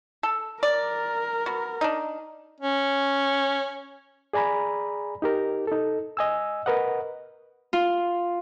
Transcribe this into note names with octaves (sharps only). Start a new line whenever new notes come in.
A4
A#4 D5
B3 F#4
D4 D#4
C#4
G#4 D5 G#5 A#5 B5
D#4 G4 A#4
D#4 A4
D#5 G#5 E6
A#4 B4 D#5 F#5
F4